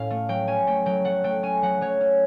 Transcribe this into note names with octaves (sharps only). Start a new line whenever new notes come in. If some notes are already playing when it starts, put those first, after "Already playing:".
Already playing: A2 C#4 F5
A3
F#3 G5
C#4 G#5
A3 G5
F#3 G5
A3 F#5
A3 G5
C#4 G#5
F#3 F#5
F#3 C#5
C#4